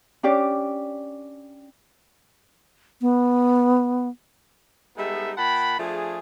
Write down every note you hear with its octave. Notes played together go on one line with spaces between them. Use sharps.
C#4 D4 G4 D5
B3
G3 G#3 B3 D#4 A4 E5
A#2 F#5 G5 A5 B5
F3 A3 D4 G#4